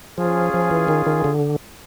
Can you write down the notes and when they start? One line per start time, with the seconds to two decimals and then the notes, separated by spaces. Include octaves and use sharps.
0.18 F3 C#4 F4 G#4
0.54 F3
0.71 E3
0.88 D#3
1.06 D#3
1.24 D3